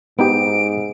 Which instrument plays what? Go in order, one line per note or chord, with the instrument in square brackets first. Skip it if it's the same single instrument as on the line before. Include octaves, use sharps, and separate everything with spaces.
[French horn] G#2 [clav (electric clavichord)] B3 D#4 G4 [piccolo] D7